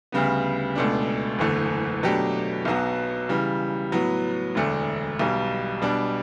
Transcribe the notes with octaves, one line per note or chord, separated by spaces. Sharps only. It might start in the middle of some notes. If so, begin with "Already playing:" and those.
D2 C#3 G3 B3
C#2 B2 A3 D4
F#1 E2 D3 A3
B2 F#3 A3 D4 G4
B1 B2 F#3 B3 F#4
C#3 E3 G3
A2 F#3 B3
E1 D2 D3 A3 D4
B1 B2 G3
B2 G3 D4